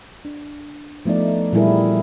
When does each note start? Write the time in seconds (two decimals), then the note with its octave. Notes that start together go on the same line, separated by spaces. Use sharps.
0.25 D4
1.05 F3 A3 B3 D#4 D5
1.53 A#2 E3 G3 E4 G#4 A#4